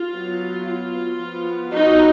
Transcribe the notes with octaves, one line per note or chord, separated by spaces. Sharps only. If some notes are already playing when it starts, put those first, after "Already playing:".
Already playing: F4
F#3 B3
F4
F3 B3
D#4 F#4